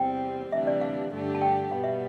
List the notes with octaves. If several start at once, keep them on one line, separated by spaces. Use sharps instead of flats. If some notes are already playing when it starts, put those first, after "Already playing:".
Already playing: E2 C3 G3 C4 G5
D2 C3 E3 G3 D4 E5
D5
F5
G2 D3 A3 D4 G4
A5
G5
B2 G3 B3 F5
E5